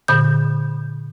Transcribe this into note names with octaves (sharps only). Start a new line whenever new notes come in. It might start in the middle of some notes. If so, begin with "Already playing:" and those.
A#2 D3 G6